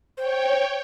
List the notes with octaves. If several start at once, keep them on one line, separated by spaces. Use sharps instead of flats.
C5 C#5 G5